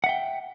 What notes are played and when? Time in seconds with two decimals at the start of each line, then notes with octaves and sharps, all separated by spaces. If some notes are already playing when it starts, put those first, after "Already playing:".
0.04 F#5
0.06 E5
0.09 G5